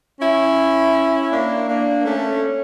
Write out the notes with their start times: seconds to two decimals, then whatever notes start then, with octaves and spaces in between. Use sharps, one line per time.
0.21 C#4 E4
1.31 A#3 D4
1.68 A#3 D4
2.05 A3 C#4